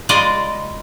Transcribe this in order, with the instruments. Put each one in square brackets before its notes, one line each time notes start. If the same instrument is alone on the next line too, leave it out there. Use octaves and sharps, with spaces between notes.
[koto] C#3 G#3 F4 D5 D#5